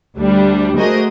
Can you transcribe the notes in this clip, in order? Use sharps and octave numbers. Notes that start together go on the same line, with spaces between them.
D2 G3 D4
A3 F#4 G#4 A#4 C5 D#5